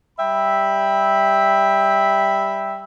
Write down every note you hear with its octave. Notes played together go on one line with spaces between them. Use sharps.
G3 E5 G5 B5